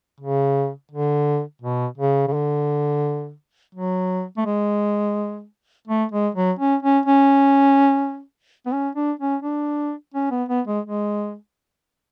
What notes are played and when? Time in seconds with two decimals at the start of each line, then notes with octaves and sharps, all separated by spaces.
0.20 C#3
0.91 D3
1.62 B2
1.98 C#3
2.28 C#3
2.33 D3
3.75 F#3
4.37 A3
4.45 G#3
5.87 A3
6.12 G#3
6.35 F#3
6.59 C#4
6.83 C#4
7.06 C#4
8.66 B3
8.72 C#4
8.95 D4
9.20 C#4
9.42 D4
10.14 C#4
10.31 B3
10.49 B3
10.68 G#3
10.85 G#3